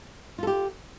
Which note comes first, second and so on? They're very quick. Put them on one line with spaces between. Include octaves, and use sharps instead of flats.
F4 A4 G4